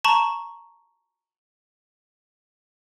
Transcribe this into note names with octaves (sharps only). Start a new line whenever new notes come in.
A5 A#5 C#6 E7 F#7